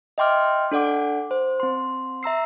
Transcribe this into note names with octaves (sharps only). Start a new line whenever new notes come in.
D#5 E5 G5 C6 D6 F6
D4 A4 D5 F#5 D6
C5
C4 C6
E5 A#5 E6 C7